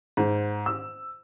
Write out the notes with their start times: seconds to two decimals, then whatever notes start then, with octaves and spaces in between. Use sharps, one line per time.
0.17 G#2
0.66 E6